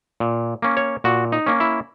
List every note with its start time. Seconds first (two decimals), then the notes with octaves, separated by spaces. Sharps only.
0.20 A#2
0.62 A#3 C#4
0.77 C#5
1.04 A#2 F#4
1.32 D#4
1.46 A#3 C#4
1.60 E4